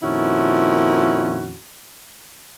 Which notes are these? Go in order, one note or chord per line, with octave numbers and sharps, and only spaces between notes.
F2 A#2 D#3 C#4 E4 F#4